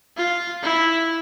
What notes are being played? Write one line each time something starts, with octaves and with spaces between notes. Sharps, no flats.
F4
E4